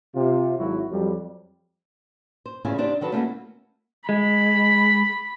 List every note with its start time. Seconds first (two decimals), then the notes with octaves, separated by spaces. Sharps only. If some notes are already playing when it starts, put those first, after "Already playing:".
0.15 C3 F4
0.57 G#1 F#3 E4 F#4
0.90 F2 F#3 G3
2.46 C5
2.65 E2 A2 C#3 E4 F4 G#5
2.78 C4 D4 D#4 F4 G4
3.01 D#3 F#3 A4 B4 A5
3.12 A3 A#3 C#4 D4 E4 F#4
4.09 G#3 B5